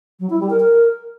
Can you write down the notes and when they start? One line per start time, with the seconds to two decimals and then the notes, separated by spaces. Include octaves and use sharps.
0.20 F#3
0.30 E4
0.40 G3
0.50 A#4
0.60 A#4